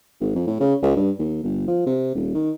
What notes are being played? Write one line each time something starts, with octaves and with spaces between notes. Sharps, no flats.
G#1
F2
A2
C#3
C#2
G2
D#2
G1
F3
C3
D#1
D#3